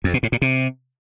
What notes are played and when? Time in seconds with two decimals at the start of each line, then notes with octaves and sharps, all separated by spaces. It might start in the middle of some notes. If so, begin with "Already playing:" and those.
0.04 F2
0.14 B2
0.23 A2
0.32 A#2
0.42 C3